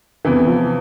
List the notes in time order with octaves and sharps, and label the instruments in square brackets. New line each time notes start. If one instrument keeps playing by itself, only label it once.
[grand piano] E2 E3 [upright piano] C3
[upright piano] F3